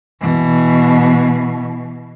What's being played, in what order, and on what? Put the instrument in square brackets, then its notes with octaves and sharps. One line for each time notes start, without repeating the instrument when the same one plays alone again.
[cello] B2 E3